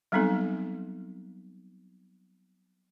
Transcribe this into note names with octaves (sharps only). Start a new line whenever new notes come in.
F#3 G3 B3 C4 D#4 A4